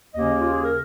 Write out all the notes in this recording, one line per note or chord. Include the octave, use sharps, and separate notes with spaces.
D#2 C#3 A#3 C#4 D#5
F4
G#4
A#4